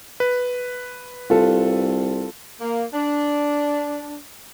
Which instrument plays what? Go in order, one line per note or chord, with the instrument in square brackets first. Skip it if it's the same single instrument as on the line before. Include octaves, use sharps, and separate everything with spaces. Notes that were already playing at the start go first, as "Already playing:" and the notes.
[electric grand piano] B4
[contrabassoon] C2 [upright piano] F4 A4
[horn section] A#3
D4